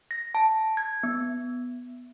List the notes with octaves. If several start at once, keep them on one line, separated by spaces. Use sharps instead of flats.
A#6
A5
G#6
B3